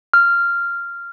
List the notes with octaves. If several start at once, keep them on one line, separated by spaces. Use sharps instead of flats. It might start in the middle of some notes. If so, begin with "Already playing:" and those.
F6